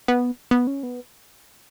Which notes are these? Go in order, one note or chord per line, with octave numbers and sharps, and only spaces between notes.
B3
B3
C#4
B3